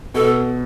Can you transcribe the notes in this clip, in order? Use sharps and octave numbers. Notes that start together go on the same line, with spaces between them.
B2 A4